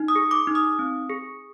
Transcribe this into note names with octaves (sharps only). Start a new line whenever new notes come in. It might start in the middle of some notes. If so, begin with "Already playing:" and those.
Already playing: D#4
D#6
G#4
D6
D#4
D#6
C4
G#4